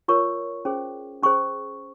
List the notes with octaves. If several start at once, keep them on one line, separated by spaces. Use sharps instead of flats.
F4 A#4 C#5 C#6
C#4 G#4 C5
C#4 G#4 C5 C#6